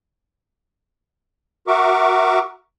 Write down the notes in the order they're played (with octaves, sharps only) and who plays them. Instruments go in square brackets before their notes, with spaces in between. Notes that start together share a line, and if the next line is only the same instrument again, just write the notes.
[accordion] F#4 A#4 E5 C#6 D6